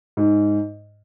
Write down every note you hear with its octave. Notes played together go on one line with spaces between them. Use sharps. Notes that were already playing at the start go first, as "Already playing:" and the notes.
G#2